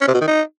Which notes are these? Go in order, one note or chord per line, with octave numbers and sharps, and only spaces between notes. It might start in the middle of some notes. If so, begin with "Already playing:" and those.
C#4
C3
B2
D#3
D#4